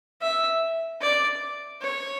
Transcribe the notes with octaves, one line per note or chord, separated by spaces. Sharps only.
E5
D5
C#5